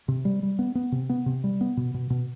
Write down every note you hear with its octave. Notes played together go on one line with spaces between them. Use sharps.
C3
G3
G3
B3
B3
C3
B3
C3
G3
B3
B2
B2
B2